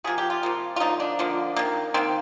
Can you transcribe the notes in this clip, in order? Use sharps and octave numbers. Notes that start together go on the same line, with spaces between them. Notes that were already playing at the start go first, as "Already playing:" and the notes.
C3 F3 A#3 G#4
G4
F4
C3 F3 A#3
F4
D3 F3 A#3 D#4
D4
D3 F3 A#3
D#3 A#3
D#3 A#3 C4